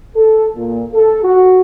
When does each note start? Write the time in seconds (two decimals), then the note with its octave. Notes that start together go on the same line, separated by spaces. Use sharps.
0.16 A4
0.56 A#2
0.93 A4
1.24 F#4